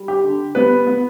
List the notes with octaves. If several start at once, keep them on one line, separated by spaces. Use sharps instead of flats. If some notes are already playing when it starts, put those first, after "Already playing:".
Already playing: G3
G4
D3
G3 B3 B4
B3